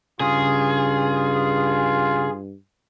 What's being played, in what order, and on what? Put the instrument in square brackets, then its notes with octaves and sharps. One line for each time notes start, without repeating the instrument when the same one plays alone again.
[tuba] G2 [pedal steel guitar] C#3 D#6 [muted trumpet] F4 [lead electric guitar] G#4